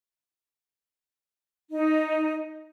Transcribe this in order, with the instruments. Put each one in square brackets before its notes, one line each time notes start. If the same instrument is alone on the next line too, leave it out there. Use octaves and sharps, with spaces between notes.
[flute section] D#4